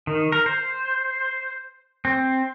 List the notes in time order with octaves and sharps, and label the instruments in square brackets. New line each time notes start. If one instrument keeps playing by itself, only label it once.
[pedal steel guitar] D#3
A#4
C5
C4